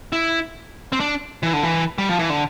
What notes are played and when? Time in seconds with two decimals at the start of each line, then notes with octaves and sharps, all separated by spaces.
0.13 E4
0.92 C4
1.00 D4
1.43 E3
1.53 D3
1.63 E3
1.98 G3
2.09 F3
2.19 E3
2.30 D3